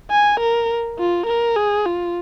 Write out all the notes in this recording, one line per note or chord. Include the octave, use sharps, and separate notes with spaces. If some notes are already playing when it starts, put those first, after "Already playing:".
G#5
A#4
F4
A#4
G#4
F4